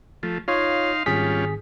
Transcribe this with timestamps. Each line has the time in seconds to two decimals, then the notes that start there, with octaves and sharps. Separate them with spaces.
0.23 F3 A3
0.48 D#4 F4 C#5 F5 C6
1.06 G#1 G3 C#4 F4 G#4 B6